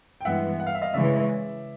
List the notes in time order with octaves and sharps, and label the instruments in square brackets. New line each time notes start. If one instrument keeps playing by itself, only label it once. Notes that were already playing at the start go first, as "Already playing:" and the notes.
[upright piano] G5
[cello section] G2 E3 G#3 B3 [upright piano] E5 F#5
[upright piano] F#5
F5
E5
D#5 F5
[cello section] C#3 E3 G#3 [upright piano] D5 E5